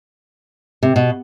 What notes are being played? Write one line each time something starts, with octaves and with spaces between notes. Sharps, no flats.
C3
B2